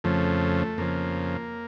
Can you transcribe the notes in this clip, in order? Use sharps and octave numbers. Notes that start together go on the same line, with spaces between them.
F2 C#3 F3 A3
F2 C#3 F3 A#3